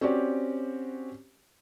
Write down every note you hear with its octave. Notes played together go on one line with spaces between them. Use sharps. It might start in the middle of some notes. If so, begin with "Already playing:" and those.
C4 C#4 F#4 G4 C#5 D5